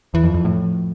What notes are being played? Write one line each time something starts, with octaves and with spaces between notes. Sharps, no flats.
E2 E3
F2
F3
F2
A2